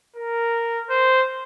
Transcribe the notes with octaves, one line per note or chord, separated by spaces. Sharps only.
A#4
C5